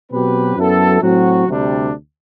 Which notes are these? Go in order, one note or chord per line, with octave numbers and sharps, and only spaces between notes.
B2 F#3 C4 G4 B4
F#2 F#3 B3 E4 A4
A2 F#3 C4 F#4
D2 C3 G3 D4